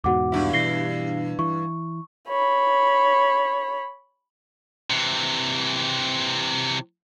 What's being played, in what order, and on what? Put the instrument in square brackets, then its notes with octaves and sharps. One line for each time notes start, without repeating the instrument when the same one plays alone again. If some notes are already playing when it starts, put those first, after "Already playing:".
[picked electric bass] E2 G#2 B2 [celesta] F#4 F#5 D6
[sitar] G2 E4
[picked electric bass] B2 E3 [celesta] A#6 C7 G7
[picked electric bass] E3 [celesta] C#6
[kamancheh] C#5 B5
[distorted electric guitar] C3 E3